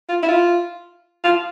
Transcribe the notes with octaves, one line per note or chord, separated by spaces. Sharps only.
F4
E4
F4
F4